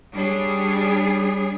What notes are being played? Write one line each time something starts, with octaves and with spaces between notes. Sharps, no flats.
G3 D4 G#4 C#5